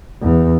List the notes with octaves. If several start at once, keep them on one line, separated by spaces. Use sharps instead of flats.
E2